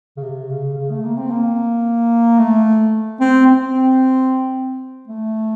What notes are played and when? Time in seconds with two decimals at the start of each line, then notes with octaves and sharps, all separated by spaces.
0.17 C#3
0.23 C3
0.50 C#3
0.77 C#3
0.90 A3
1.04 A#3
1.17 C4
1.31 A#3
2.39 A3
3.20 C4
3.46 C4
5.07 A3